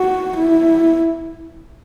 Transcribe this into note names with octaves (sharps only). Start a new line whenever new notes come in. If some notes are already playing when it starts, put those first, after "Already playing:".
Already playing: F#4
E4